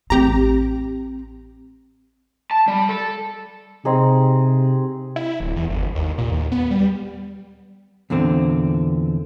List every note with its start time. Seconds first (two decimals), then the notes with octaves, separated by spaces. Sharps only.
0.10 A1 C4 G4 A#5
2.51 A5
2.68 G3
2.89 A4
3.85 C3 C4 D#4 G#4
5.16 E4
5.40 D1
5.56 E2
5.70 G1
5.95 D#2
6.18 A#2
6.32 D#2
6.52 B3
6.71 G3
8.10 E2 A#2 D3 C4